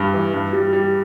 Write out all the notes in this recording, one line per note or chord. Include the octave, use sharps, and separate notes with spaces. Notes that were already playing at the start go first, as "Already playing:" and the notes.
Already playing: G2 G3
E3
G2
G3
G3